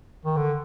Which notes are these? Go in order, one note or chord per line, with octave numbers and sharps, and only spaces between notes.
D#3
D3